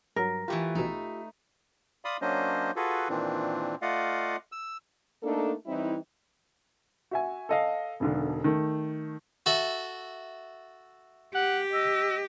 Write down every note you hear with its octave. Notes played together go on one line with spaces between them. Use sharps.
G2 F#3 A#4
E3 A3 F4 G4 B4
A#1 B2 D#4 E5
D5 F5 B5 C6 D#6
F#3 A#3 C#4 D4 C5 D#5
F4 F#4 G#4 A4 B4
A#2 D#3 E3 C4 D4
A3 F4 D5 D#5 F5 F#5
E6
A3 A#3 D4 D#4 A4
E3 G3 C4 D#4 E4
F#4 E5 G#5
A4 D#5 F5
E1 B1 D3
D#3 A3
F#4 A4 E5
G4 F#5
D#5 E6